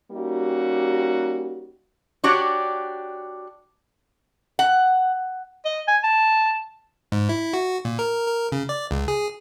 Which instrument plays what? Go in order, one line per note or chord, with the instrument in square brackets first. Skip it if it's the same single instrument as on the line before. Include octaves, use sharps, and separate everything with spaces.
[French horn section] G3 A#3 C#4 D#4 F#4 G4
[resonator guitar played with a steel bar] D4 F#4 G4 C#5 D5
F#5
[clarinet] D#5
G#5
A5
[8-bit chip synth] G#2
E4
F#4
A#2
A#4
A#4
C#3
D5
C#2
G#4